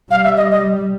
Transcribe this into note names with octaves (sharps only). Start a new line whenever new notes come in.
G3 F5
E5
D#5
D#5